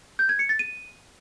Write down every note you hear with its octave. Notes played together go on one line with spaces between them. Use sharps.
G6
G#6
C#7
A6
D#7